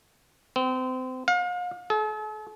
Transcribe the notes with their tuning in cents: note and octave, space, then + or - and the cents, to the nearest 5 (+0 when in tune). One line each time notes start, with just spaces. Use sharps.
C4 -30
F5 +40
A4 -45